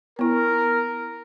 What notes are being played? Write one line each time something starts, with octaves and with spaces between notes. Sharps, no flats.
B3 E4 A#4